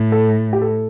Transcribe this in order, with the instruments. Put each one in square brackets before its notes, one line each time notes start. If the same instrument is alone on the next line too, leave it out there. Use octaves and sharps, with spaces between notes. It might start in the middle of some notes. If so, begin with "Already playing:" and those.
Already playing: [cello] A2
[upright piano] A4
G4
A4